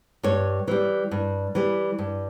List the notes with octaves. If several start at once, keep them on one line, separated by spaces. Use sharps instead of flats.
G2 C#5
E3 G3
G2
E3 G3
G2